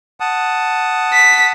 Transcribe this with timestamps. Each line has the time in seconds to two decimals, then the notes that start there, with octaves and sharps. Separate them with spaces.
0.20 F#5 A5 D#6
1.13 B6